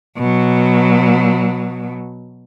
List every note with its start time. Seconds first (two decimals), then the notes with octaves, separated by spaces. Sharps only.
0.18 B2 F#3